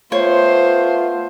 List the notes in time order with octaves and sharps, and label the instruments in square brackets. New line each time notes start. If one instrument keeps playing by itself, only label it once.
[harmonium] A3 B3 [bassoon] F4 [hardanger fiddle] C5 [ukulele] C#5